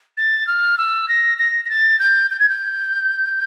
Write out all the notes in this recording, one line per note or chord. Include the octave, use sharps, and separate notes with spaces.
A6
F6
E6
A#6
A#6
A#6
A6
G6
G6
G#6
G6